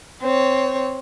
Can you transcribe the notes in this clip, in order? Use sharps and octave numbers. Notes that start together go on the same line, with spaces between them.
C4 C#5